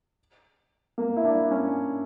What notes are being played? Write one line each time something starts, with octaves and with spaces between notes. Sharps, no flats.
A#3
E4
D4
C#4